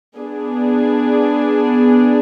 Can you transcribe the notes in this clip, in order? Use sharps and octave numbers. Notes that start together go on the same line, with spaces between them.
B3 D4 G#4